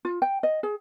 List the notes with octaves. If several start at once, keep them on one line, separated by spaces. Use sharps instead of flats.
F4
G5
D#5
G#4